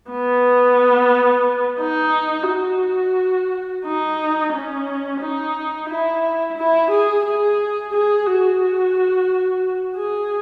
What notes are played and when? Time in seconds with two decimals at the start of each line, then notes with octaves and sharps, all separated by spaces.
0.11 B3
1.80 D#4
2.49 F#4
3.85 D#4
4.52 C#4
5.20 D#4
5.89 E4
6.57 E4
6.91 G#4
7.25 G#4
7.93 G#4
8.27 F#4
9.97 G#4